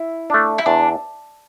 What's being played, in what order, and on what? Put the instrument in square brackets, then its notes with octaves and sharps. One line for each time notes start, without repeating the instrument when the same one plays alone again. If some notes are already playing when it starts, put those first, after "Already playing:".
Already playing: [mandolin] E4
[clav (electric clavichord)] A3 D4
[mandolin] E4
[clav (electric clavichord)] E2 [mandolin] D4